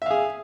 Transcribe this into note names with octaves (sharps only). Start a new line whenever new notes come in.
G#4 E5 F5